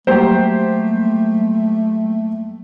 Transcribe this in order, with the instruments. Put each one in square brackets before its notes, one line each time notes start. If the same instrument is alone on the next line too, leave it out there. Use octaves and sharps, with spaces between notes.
[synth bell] F#3 G3 A#3 [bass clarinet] A3 [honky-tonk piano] G4 C5